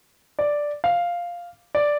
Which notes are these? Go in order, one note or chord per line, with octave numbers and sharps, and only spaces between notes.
D5
F5
D5